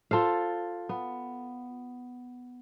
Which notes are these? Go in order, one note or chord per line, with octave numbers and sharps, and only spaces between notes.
F4 A4 C5 F5
B3